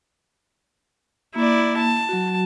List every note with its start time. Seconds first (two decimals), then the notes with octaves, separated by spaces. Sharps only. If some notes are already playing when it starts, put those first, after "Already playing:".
1.36 A#3 E4 D5
1.78 A5
2.09 F#3 F#4